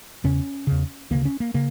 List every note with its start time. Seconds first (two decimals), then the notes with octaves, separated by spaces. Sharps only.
0.24 E2 C#3 C#4
0.67 E2 C#3
1.11 D2 C#3 A#3
1.25 C#4
1.40 A#3
1.54 C#3 A#3